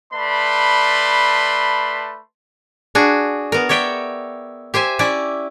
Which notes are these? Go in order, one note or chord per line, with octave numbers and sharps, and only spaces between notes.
A3 B4 D5 A5 B5 C6
D4 F#4 G#4
B3 A#4
C#5 D5 E5 G5
G4 C5 E5 G#5
C#4 E4 D5